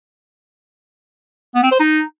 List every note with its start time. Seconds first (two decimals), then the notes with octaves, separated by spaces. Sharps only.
1.55 B3
1.63 C4
1.71 C5
1.80 D#4